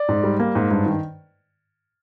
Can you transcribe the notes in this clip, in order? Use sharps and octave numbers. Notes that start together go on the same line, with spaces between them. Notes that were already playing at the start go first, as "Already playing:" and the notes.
Already playing: D5
G#2
G3
A#3
G#2
G2
D#3